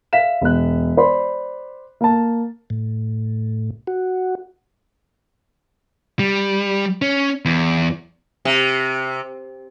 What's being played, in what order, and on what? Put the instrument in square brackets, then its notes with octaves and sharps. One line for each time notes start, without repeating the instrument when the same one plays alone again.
[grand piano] E5 F5 B6 E7
E1 F#6
C5 D5 B5 C6
A#3 A5
[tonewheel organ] A2
F#4
[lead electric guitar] G3
C#4
E2
[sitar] C3